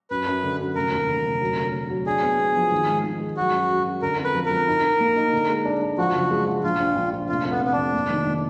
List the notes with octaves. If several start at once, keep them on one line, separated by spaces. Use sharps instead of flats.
F#2 B4
F#2
D3
F#2
F1 A#4
D#2
D3
F1
F#3
D3
D3
F#3
D4 G#4
B3
B3
F3
D#3
G#2
D#3
G#3
F#3 F#4
F#2
F#3
F#2
D3 A#4
F2
B4
F3
A#4
F3
D#4
D#4
A#3
D#4
D3
G#3
D4
D4
F3 F#4
F#1
G#3
F3
A#1 F4
A#1
A#1
A#1
F1 F4
F2
B3
F2 B3
D4
F1
A#3
D#3
D#3